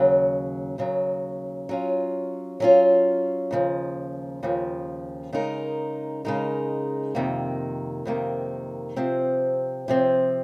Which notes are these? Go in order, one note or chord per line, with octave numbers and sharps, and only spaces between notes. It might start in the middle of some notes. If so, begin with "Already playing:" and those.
Already playing: D#2 C#3 F#3
D#2 C#3 F#3
F#3 C#4 F4
F#3 C#4 F4
D#2 C#3 F3
D#2 C#3 F3
C#3 G#3 D#4 A#4
C#3 G#3 D#4 A#4
F2 C3 D#3 A#3
F2 C3 D#3 A#3
C3 F3 C4
C3 F3 C4